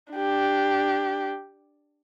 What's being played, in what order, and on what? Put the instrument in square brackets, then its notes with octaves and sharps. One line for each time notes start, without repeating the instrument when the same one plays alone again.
[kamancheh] D4 G4